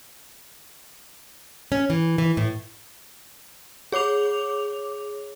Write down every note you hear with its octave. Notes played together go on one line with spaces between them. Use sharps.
C#4
E3
E3
A2
G#4 C#5 D6 F7